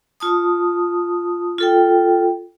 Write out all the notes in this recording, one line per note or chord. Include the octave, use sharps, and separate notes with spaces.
F4 A5 D#6
F4 A4 G5